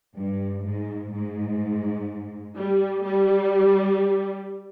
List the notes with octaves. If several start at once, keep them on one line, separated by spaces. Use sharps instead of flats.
G2
G#2
G#2
G3
G3